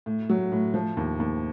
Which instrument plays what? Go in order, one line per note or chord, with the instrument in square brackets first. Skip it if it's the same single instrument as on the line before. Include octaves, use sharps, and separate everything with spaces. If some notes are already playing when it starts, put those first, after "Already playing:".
[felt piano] A2
F#3
A2
F3
D#2
D#2